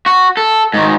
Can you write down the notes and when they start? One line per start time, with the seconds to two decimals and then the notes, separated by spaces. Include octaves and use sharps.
0.06 F#4
0.37 A4
0.74 G#2 D#3